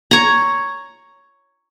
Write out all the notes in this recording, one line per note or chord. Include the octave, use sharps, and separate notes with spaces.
C#5 A#5